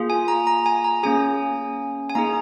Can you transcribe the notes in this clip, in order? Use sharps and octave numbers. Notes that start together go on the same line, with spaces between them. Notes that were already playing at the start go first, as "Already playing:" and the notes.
Already playing: A#3 F4 G#4
G#5
A#5
A#5
G#5
A#5
A#3 C#4 G#4 G#5
G#5
A#3 D#4 G#4 A#5